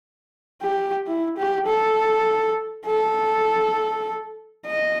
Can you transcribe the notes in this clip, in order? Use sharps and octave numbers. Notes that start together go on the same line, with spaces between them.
G4
E4
G4
A4
A4
D#5